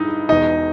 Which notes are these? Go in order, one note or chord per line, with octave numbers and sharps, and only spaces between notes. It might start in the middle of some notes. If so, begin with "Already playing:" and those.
Already playing: G2 D#4 E4 D#5
E1 E2 B2 D#4 D#5